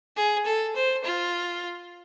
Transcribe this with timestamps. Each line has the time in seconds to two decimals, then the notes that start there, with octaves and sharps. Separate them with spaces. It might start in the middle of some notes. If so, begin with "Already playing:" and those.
0.17 G#4
0.45 A4
0.76 C5
1.04 F4